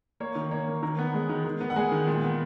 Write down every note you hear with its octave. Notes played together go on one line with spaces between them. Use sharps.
A#3 C#5
D#3
A#3 C#5
D#3
D#3 A#4
B3
G#3
D#3
D#3
B3
F#5
G#3 G#5
D#3
A#2
B3